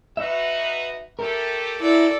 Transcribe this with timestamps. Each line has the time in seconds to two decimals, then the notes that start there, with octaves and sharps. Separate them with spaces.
0.17 D#4 F#4 B4 E5
1.19 A3 G4 A4 A#4
1.79 A#2 F#3 E4 A4 D5